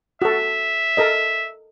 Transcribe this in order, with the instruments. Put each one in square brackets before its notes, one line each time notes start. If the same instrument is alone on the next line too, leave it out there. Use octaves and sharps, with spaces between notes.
[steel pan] F#4 A4 [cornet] E5
[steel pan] A4 A#4 D#5